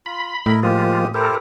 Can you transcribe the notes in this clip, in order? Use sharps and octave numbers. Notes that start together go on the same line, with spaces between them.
F4 B5
A2 E4 A#4 D#5
F3 G#3 A#3 F4 G4 D#6
E4 G4 A4 A#4 C5